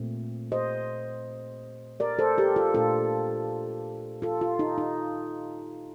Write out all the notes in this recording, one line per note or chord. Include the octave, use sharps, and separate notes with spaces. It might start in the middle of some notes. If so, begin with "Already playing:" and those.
Already playing: A#2 A3 C4
C5 D#5
A#4 D5
A4 C5
G4 A#4
F4 A4
A#2 A3 D4 F4 A4
F4 A4
F4
D#4
D#4